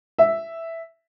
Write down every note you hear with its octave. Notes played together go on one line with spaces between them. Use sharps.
E5